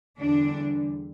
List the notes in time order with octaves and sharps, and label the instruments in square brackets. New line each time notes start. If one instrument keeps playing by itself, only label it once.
[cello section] E2 D3 G3 D4